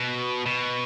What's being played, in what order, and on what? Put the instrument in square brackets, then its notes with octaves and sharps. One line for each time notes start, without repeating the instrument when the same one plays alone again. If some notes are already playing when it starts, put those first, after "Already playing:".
Already playing: [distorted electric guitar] B2
B2